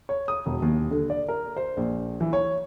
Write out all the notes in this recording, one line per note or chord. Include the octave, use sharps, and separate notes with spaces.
C#5
D#6
E1
D#2
D3
D5
A#4
C5
A#1
E3
C#5